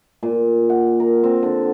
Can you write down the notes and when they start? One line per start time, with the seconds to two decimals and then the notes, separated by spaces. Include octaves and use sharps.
0.23 A#2
0.70 F#5
1.00 A#4
1.24 C4
1.43 D3